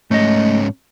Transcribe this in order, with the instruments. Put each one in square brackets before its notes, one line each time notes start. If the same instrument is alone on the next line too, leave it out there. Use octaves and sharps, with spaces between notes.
[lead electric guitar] G#2 C#4 [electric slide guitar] A3 D#5